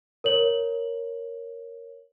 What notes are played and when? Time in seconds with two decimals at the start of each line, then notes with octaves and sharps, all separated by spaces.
0.24 A#4 C#5 F#7